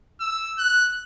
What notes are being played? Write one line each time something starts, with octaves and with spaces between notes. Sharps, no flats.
E6
F#6